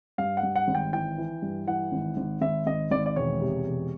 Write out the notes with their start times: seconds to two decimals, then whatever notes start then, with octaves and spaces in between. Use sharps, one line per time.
0.18 G2 F5
0.37 F#5
0.43 G2
0.56 F#5
0.68 G#1
0.75 G5
0.93 E3 G5
1.18 E3
1.42 G2
1.67 E3 F#5
1.92 G#1
2.17 G#1
2.41 G#1 E5
2.66 G#1 D#5
2.91 G#1 D5
3.06 D5
3.16 E1 C#5
3.41 C3
3.66 E1